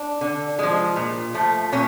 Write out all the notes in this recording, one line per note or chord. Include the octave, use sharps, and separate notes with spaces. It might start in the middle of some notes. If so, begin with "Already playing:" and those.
Already playing: D4
D3
F3 G#3
A#2
F3 A3
A#2 C#4